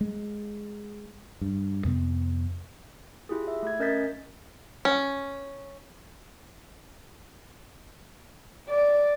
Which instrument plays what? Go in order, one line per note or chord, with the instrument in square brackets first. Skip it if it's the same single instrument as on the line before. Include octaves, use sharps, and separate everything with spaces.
[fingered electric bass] G#3
G2
F2 C3 B3
[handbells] E4 F4 G4 G#4
E5
A3 G#6
C#4 A#4 D#5 G6 A6 B6
[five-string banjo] C#4
[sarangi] D5